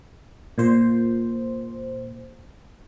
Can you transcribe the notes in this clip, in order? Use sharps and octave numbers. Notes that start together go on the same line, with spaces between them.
A#2 C5